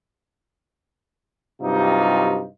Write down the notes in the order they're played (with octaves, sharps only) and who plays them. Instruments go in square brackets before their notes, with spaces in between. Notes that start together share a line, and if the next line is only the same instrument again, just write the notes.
[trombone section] G2 C3 F#3 D#4 F4